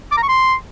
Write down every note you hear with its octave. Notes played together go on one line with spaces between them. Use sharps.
D6
A#5
C#6
C6